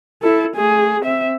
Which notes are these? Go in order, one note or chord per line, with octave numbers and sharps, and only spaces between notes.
E4 A4
A3 G#4
C4 E5